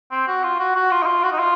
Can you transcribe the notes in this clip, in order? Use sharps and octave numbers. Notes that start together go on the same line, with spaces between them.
C4
F#4
F4
F#4
F#4
F4
D#4
F4
F#4
D#4
F4